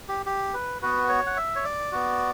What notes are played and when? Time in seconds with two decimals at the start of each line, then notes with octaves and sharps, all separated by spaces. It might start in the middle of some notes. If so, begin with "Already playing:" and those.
0.09 G4
0.26 G4
0.54 B4
0.82 B3 F#4 B4
1.09 C#5
1.26 F#5
1.37 E5
1.56 C#5
1.65 D5
1.92 B3 F#4